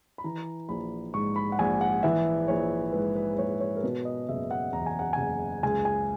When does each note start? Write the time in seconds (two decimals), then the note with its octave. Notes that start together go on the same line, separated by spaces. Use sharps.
0.18 B5
0.24 E3 A#5
0.69 A#1 B5
1.14 G#2 C#6
1.36 B5
1.52 F#5
1.59 A#1 G#5
1.81 F#5
2.03 E3 E5
2.48 A#1 C#5
2.93 G#2 B4
3.16 B4
3.38 A#1 C#5
3.60 C#5
3.76 A#4
3.83 B2 B4
4.05 D#5
4.29 F#1 E5
4.51 F#5
4.73 E2 A#5
4.86 G#5
4.99 F#5
5.13 F#1 G#5
5.63 C#2 G#5
5.85 G#5